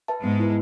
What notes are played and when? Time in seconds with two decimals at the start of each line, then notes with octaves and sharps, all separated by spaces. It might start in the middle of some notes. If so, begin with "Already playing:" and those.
0.08 B4 E5 A5
0.23 G#2 G#3 B3
0.40 E4 B4